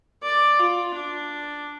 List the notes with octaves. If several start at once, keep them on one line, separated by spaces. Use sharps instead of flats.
D5
F4
D4